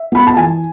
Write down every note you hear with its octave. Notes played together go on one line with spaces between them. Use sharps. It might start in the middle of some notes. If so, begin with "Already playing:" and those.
Already playing: E5
B3 B5
A5
E3 G#5